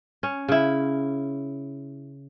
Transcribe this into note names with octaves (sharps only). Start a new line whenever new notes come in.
C#4
C#3 E4